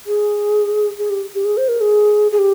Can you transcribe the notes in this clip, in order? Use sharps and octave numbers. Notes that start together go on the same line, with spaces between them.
G#4
G#4
G4
G4
G#4
C5
A#4
G#4
G#4
G4